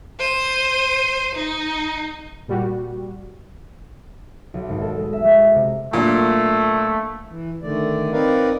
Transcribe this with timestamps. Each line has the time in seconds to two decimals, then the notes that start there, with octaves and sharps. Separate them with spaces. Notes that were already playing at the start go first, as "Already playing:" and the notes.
0.19 C5 D#7
1.36 D#4
2.48 A#2 G3 F#4
4.54 B1
4.69 G#1
4.82 A4
4.99 G#3
5.13 E5
5.25 G#3
5.55 C3
5.93 A#2 F#3 A3 A#3 D4
7.29 E3
7.62 D3 D#3 A3 D5
8.12 C4 D#4 A#4 B4 D5 F5